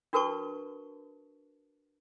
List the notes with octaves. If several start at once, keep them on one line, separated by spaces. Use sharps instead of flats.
D4 F#4 A#4 B4 A5 C#6